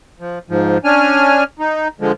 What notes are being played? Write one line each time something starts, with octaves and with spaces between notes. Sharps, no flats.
F3
G#2 F3
C#4 D4 G#5 F6
D#4
D3 F3 G#3